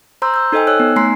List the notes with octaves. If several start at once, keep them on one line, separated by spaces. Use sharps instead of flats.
C5 A#5 C6 E6 G6
E6 G6
D#4 A4 C5 D#5 G5 G#5
C#5 E6 F#6
B3 D#4
A3 G#5 A#5 C6 C7